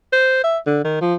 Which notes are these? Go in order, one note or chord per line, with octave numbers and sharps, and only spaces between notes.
C5
E5
D3
D#3
F3